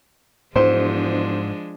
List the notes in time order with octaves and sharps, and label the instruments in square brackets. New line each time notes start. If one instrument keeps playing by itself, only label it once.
[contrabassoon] E1 [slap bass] G#2 [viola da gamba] F3 G#3 D4 [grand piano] C5